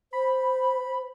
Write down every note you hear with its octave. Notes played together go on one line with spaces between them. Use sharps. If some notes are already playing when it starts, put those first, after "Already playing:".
C5 B5